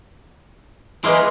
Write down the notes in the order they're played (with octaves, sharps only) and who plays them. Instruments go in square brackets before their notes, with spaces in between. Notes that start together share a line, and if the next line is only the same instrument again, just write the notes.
[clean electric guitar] E3 G#3 A#3 [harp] B4 D#5 C6